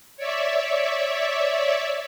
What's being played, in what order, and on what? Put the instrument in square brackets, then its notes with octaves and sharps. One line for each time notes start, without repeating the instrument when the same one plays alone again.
[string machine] C#5 D5 E5